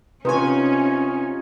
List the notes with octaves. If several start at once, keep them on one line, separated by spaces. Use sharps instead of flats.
C3 C#4 D#4 F4 B4 C#5 G#5